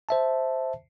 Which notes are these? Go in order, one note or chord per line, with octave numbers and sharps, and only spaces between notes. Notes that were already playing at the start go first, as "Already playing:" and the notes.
C5 E5 A5